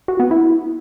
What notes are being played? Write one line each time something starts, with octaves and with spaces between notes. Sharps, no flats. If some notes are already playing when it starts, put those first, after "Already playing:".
F#4
B3
E4